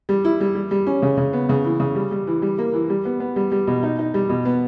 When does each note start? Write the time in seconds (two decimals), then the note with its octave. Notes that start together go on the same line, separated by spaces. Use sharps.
0.09 G3
0.25 E4
0.41 G3
0.55 G3
0.71 G3
0.87 C#4
1.02 C#3
1.17 C#3
1.33 B3
1.49 C#3
1.65 E3
1.80 C#3
1.95 G3
2.11 G3
2.27 E3
2.42 G3
2.58 A#3
2.74 E3
2.90 G3
3.05 B3
3.20 B3
3.36 G3
3.52 G3
3.67 B2
3.83 D#4
3.99 D#4
4.14 G3
4.29 B2
4.45 B3